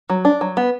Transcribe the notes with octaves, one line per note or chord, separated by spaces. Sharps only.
F#3
D4
F#3
B3